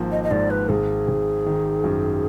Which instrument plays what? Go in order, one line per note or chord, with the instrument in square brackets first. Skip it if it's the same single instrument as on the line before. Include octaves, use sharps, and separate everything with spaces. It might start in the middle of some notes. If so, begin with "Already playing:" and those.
Already playing: [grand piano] G#1 F3 A#3
[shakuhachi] D#5
D#5
[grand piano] G#2 [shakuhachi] D5
[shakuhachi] B4
[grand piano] G#1 [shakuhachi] G#4
[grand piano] G#1
D#3
F#2